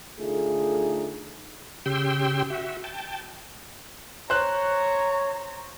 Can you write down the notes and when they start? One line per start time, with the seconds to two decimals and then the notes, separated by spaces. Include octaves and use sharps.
0.19 D3 A3 D#4 F4 G#4
1.86 C#3 G4 G5 C6 E6
2.50 F#4 E5
2.84 G5 A5
4.30 C5 C#5 A#5 F#6